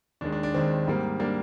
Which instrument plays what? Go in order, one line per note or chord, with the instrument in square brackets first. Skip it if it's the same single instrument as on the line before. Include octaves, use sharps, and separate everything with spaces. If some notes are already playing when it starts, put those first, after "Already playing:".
[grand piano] D#2 D#3 G#3 D4
D4
D4
D#2 D#3 G#3 C4
G#2 G3 A#3
G3 A#3 D4